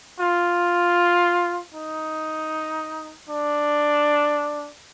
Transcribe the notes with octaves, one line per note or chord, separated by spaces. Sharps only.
F4
D#4
D4